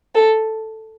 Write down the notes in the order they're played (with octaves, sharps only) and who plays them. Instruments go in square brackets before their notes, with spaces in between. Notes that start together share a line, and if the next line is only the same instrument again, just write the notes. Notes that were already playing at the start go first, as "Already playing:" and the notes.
[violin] A4